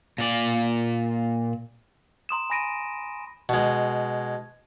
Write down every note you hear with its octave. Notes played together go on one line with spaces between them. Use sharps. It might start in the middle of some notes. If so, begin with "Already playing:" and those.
A#2 D5
A#5 C6 D#6 E7
G#5 B5 A#6 D7 D#7
B2 G#3